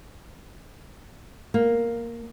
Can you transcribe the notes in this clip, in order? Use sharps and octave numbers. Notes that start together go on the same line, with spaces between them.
A#3